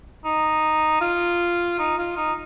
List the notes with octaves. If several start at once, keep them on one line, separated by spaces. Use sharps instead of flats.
D#4
F4
D#4
F4
D#4